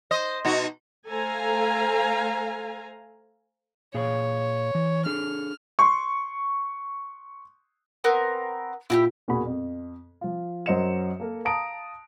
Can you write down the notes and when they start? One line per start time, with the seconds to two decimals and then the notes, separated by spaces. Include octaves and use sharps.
0.11 C5 D#5
0.45 B2 D#4 F#4
1.08 A3 A4 C5 F5 G#5 A#5
3.94 A#2 G#4 C#5 F5
4.75 E3
5.06 D4 G#4 A4 F6
5.79 C6 C#6
8.04 B3 C4 A#4
8.90 A#2 E4 F#4 G4
9.28 E1 A#2 F#4 G#4 B5
9.46 F2
10.21 F3 F4
10.66 F#2 F#3 C5 D#5 C#7 E7
11.20 A#3 A4 A#4
11.45 F5 A5 A#5 D#6 D7